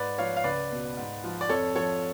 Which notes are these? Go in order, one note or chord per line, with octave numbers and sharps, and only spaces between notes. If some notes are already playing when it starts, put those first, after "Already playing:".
Already playing: G#2 B4 D5
F3 C#5 F5
F5
C#2 B4 D5
B2
G#2
F3
D5
F2 A4 C#5
F3 A4 C#5